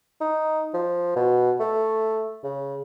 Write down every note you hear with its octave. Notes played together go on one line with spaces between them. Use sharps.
D#4
F3
B2
A3
C#3